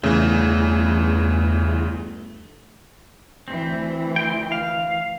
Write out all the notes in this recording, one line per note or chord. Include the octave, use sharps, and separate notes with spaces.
G1 E2 C#3 E3 A3
D2 E3 C4
G5 C6
F5